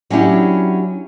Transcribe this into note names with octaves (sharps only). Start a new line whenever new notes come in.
F#3 C#4 D4 E4 G4